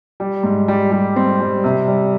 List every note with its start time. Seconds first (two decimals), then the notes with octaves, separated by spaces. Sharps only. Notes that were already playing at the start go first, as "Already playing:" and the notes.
0.20 G3
0.43 G#2
0.68 G3
0.92 G3
1.16 C4
1.41 G3
1.64 C3
1.88 G3